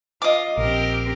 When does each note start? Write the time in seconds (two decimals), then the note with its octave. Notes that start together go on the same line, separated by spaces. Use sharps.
0.22 F4 D#5 D6
0.57 A#1 C4 G4 A#4